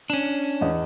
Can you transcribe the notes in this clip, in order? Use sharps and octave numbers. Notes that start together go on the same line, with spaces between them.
C#4 D4
E2 D#5